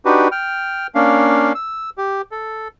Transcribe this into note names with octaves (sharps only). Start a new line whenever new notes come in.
D4 D#4 F#4 G4 B4
G5 F6
A#3 C#4 D4 F5
E6
G4
A4